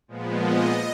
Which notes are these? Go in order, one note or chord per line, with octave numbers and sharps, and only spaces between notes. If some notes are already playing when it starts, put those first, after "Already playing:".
A#2 F3 G#3 B3
D#5